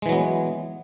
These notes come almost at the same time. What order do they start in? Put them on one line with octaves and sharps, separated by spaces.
G#3 E3 F#3 B3